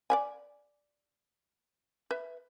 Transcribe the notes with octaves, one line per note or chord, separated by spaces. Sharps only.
D5 E5 G#5
B4 E5